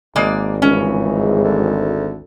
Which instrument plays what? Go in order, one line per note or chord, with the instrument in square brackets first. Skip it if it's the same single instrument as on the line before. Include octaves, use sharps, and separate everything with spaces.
[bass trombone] G#1 [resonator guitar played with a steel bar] G#3 A#3 D5
[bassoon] C#2 [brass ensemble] G2 E3 G#3 [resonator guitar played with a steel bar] C#4
[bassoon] D2